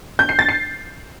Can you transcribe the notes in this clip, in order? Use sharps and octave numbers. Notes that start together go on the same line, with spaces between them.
G6
C7
A6
C7